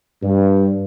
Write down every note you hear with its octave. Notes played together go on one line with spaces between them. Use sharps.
G2